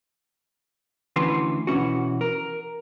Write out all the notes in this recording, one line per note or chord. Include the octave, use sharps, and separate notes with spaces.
D2 E3 C#4 B4 C6
B2 E3 C#4 F#4
A#4